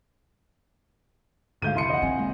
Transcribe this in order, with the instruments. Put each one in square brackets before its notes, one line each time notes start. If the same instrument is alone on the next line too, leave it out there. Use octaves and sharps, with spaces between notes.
[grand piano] D2 [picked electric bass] G#2 G#3 [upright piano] F5 G6 D#7
[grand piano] C2 C6 C#7 [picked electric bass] F2 D3 E3
[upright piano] D#5 F#5
[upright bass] C4 [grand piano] G#5
[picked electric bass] C3 G#3 A#3